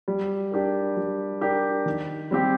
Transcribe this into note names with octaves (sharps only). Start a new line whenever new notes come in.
G3
D4 G4 A#4
G3
D4 G4 A#4
D#3
G3 C4 G4